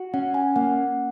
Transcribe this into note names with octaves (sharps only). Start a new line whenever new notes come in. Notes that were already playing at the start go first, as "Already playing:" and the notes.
Already playing: F#4
C#4 F#5
G#5
A#3 F#5